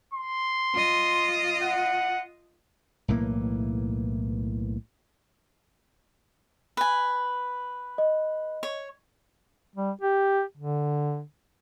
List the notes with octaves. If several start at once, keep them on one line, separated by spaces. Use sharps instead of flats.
C6
F4 D#5
F#5
B1 A2 E3 A#3
B4 G#5
D#5
C#5
G3
G4
D3